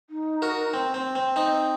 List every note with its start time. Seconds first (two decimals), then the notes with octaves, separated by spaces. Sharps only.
0.10 D#4
0.42 F#4 A#4
0.74 C4
0.94 C4
1.15 C4
1.36 C4 D#4